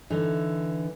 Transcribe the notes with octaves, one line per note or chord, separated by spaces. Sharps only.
D3 E3 D#4